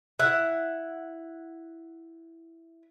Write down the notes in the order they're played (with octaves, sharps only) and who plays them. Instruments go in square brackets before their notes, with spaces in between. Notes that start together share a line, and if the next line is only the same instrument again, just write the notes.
[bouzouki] E4 F#5